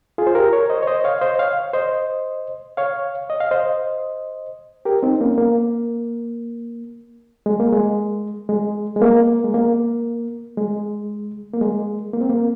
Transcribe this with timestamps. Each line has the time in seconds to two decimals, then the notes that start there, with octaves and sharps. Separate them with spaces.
0.18 F4 G#4
0.27 C5
0.35 G4 A#4
0.53 A#4 C#5
0.69 C5 D#5
0.83 C#5
0.87 C5 D#5
1.04 C#5 F5
1.21 C5 D#5
1.39 C#5 F5
1.73 C5 D#5
2.77 C#5 F5
3.30 D#5
3.40 F5
3.51 C5 D#5
4.85 G4 A#4
5.03 C4 D#4
5.20 A#3 C#4
5.38 A#3
7.46 G#3
7.60 A#3
7.73 G#3
8.49 G#3
8.96 G#3
9.02 A#3
9.44 G#3
9.54 A#3
10.57 G#3
11.54 A#3
11.61 G#3
12.13 A#3
12.21 C4
12.29 A#3